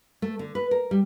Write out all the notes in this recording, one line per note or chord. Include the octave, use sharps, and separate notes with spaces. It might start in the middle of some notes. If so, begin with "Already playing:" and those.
A3
D3
B4
A#4
G3